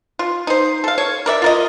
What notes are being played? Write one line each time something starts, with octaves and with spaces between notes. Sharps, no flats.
F4
D#4 C5
A4 F5
C#5
A#4 D5 E5
F4 A#4 D#5